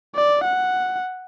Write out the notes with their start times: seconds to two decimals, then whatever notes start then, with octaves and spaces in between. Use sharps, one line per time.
0.15 D5
0.44 F#5